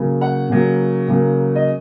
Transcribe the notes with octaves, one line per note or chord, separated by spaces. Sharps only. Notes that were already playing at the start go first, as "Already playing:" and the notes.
Already playing: C#3 F#3 A#3
F#5
C#3 F#3 A#3
C#3 F#3 A#3
D#5